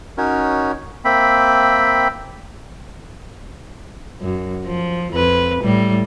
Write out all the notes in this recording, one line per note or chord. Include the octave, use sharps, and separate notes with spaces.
C#4 D#4 F#4 A#4 C#5
A#3 C4 E5 G5 B5
F#2
F3
F2 B4
A2 G3